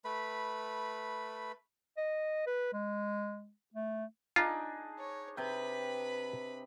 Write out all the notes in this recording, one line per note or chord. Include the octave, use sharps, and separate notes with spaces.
A3 B4 B5
D#5
B4
G#3
A3
D4 D#4 F4 G#4
C#5
C3 B4 G5 B5